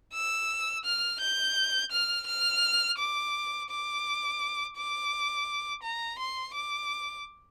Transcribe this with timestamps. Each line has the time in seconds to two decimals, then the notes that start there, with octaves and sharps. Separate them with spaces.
0.14 E6
0.85 F6
1.21 G6
1.92 F6
2.27 F6
2.99 D6
3.70 D6
4.77 D6
5.83 A#5
6.19 C6
6.54 D6